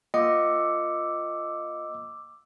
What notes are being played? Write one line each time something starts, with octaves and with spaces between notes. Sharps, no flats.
A#3 F4 D#5 F#5 D6 E6